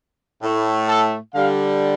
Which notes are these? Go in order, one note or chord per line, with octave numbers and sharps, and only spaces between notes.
A2 A3
A4
D3 G3 F5